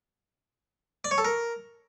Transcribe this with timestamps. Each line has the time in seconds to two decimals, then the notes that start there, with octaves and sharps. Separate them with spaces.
1.04 D5
1.11 C#5
1.18 A4
1.25 A#4